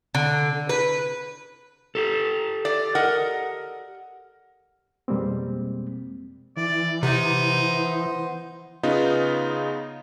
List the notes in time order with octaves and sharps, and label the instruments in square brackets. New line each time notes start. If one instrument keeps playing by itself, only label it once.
[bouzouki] D3
B4
[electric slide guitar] G4 A4
[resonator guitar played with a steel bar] D5
A#4 D#5 F#5
[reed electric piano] F2 B2 G3 G#3 A#3 C4
[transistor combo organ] E3 [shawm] D5
[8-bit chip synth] C3 [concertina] B3 C5 [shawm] D#4
[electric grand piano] C#3 B3 D#4 F4